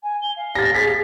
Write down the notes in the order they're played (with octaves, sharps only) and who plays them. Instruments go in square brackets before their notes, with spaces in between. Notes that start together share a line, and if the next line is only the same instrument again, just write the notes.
[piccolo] G#5
G7
F5
[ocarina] G4 [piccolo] F5 [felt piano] A6 A#6
[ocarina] G#4 [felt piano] A6 B6